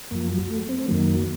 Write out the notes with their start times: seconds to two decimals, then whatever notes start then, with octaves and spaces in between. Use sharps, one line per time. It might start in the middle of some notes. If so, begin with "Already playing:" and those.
0.11 F#2 F3 A#3
0.30 F#3
0.50 A3
0.69 C4
0.88 F#2 D#3 F#3 A#3